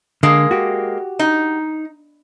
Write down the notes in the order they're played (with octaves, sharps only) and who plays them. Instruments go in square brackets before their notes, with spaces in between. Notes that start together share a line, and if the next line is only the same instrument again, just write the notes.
[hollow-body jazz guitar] D3 [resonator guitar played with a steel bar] G#3 A#3
[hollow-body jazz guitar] F#4 G4
[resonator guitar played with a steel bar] D#4